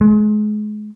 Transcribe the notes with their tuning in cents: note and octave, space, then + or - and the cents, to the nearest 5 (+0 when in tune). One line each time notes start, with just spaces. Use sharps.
G#3 +30